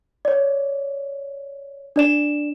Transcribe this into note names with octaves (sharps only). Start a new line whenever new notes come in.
C#5 D5
D4 D5 E7